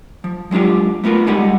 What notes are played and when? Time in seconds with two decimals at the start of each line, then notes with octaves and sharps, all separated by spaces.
0.24 F3
0.51 F#3 G#3 D4 F4 G4
1.04 A3 B3 F4 A#4 B4
1.27 D3 G3 G#3 D#4 G4 F#5